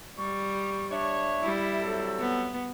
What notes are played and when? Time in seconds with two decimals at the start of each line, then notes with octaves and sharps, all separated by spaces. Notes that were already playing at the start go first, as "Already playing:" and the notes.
0.18 G3 C#6
0.91 D4 C#5 E5
1.41 G3 E4
1.82 F#3 C4 A4
2.19 B3